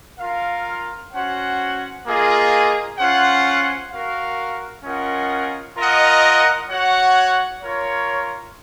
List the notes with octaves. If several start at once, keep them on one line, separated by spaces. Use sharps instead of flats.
F4 A#4 F5
C#4 F#4 C5 F#5
A#3 F4 G#4 D#5
C#4 F4 C5 F#5
F#4 A#4 F5
C#4 F4 A#4 D#5 F#5
F4 A#4 D#5 F#5
F#4 C#5 F#5
F4 A#4 C#5